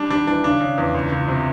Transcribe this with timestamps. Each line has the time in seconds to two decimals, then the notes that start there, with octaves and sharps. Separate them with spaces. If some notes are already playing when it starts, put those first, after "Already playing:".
Already playing: G3 D4
0.10 G3 D4
0.27 E3 D4
0.44 C#3 D4
0.61 C#3
0.78 E2
0.94 C#2
1.12 C#2
1.28 C3